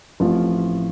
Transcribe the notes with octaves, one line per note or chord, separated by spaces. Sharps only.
A1 A2 F3 C4 F4